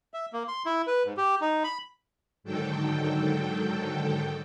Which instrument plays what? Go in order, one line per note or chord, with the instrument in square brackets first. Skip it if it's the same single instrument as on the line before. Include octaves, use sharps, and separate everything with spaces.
[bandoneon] E5
A#3
C6
E4
B4
G#2
G4
D#4
B5
[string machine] G#2 D3 D#3 F#3 A4 G5